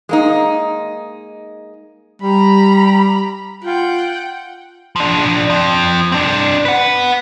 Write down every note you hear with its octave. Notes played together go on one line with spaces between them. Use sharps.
G#3 A#3 D#4
G3 A#5 B5
F4 F#5 G5
F3 D4
F3 C4
C4 D4
B4 F#5